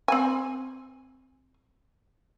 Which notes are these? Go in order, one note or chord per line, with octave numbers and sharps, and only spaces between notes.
C4 G#5